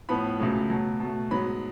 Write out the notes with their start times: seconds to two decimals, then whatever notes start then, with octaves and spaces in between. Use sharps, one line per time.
0.09 A2 F3 B3 B5
0.40 C#2 C#3 F#3 A3
0.70 B2 F#3 A3
1.00 B2 A3
1.31 G#2 F#3 B3 B5